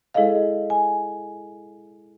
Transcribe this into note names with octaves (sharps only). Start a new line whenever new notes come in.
G#3 E4 G#4 A4 D#5 F5
G#5